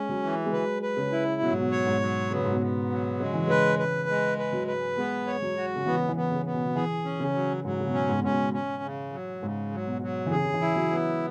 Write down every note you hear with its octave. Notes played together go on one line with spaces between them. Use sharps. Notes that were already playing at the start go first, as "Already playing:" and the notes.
Already playing: G#3 C#4
F#3
E3
G#3
F#3 B4
B4
C#3
E4
B2 F#3
G#2
B2
C#5
G#2
F#3
C#3 B3
B2
G#2
B2
B3
F#3
C#3 G#3
E3
C#3 B4
B4
G#3
B4
F#3
B4
G#3 B3
C#5
F#3
F#4
C#3
E3 B3
E3
B3
C#3
B3
B2
F#3
E3 G#4
C#4
C#3
F#3
G#2 F#3
C#3
B2
C#4
G#2
B2
G#2 C#4
B2
C#4
C#3
F#3
G#2 C#3
F#3
B2
F#3
E3
C#3 G#4
C#3
E3
E4
F#3
B3